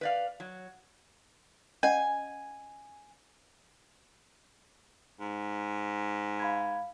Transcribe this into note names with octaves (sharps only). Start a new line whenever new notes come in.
B4 D5 F5
F#3
C#4 D#5 F#5 G#5
G#2
F5 B5 G#6